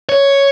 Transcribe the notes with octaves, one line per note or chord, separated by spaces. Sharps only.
C#5